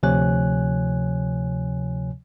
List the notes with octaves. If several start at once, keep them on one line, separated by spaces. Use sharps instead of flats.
D2 C3 F3 C#5 G#5 F#6